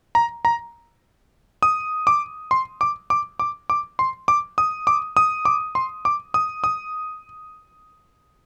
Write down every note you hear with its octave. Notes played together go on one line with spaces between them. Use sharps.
A#5
A#5
D#6
D6
C6
D6
D6
D6
D6
C6
D6
D#6
D6
D#6
D6
C6
D6
D#6
D#6